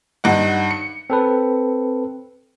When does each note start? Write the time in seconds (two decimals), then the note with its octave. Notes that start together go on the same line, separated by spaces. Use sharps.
0.24 G2 D#4 F#5
0.71 C#7
1.10 C4 A4 B4